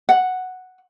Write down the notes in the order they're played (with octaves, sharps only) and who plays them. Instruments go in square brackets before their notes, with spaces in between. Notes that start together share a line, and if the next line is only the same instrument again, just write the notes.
[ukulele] F#5